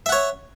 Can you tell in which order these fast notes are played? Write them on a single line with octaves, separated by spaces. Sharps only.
E5 F#5 C#5